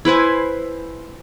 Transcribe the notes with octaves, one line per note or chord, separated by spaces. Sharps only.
E4 B4 C5 G#5